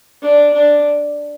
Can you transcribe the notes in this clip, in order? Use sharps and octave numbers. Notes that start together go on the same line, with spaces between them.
D4
D4